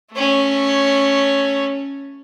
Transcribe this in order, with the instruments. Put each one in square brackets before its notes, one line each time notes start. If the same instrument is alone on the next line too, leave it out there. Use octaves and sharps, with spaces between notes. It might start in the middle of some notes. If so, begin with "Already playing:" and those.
[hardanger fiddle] A3 C#4